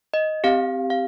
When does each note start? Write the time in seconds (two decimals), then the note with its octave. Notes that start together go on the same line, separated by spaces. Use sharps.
0.14 D#5
0.44 C4 G4 F5
0.90 F5